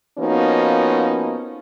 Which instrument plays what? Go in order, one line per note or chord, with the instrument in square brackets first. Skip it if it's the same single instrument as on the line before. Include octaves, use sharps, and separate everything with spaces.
[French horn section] F3 A#3 B3 C#4 D#4 F#4